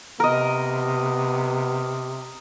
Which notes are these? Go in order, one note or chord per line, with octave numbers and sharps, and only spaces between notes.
C3 B3 A#4 D#5